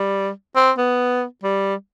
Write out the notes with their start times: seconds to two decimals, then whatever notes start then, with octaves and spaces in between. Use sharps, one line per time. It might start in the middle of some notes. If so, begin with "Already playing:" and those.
Already playing: G3
0.56 C4
0.78 B3
1.44 G3